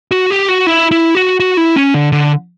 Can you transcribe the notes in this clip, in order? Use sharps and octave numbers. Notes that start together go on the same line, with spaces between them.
F#4
G4
F#4
E4
E4
F#4
F#4
E4
C#4
D3
D3